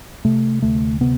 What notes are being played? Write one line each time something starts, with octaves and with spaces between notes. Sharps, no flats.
C3 A3
D2 A3
C3 B3